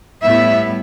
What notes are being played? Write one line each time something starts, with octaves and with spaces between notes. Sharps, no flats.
A2 G3 B3 E4 E5